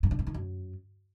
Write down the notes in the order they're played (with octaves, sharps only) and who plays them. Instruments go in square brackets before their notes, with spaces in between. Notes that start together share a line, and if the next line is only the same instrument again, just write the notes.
[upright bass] G2
D3
G2
D#3
F#2